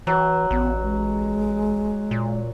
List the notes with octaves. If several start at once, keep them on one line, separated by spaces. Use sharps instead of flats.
E3 F#3
A1 B3
G#3
A#2